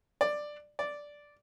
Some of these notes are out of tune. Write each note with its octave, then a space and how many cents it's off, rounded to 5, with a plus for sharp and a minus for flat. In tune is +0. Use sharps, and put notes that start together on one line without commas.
D5 +10
D5 -5